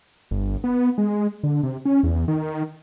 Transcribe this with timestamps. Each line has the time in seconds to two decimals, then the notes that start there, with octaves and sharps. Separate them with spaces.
0.31 G1
0.64 B3
0.98 G#3
1.43 D3
1.63 C3
1.85 C#4
2.03 E2
2.28 D#3